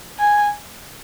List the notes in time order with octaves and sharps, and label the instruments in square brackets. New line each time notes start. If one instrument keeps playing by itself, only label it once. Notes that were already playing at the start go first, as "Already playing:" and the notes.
[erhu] G#5